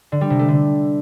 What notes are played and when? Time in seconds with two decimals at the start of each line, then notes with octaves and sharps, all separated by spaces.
0.12 D3
0.21 G3
0.30 C3
0.39 A3
0.48 D3